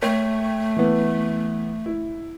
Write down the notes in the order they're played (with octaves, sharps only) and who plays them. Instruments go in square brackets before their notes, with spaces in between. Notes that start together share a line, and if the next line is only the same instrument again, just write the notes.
[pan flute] A3 [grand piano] C#5 G5
[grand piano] E3 B3
E4